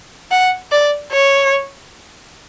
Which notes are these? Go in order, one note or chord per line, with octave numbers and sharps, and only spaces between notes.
F#5
D5
C#5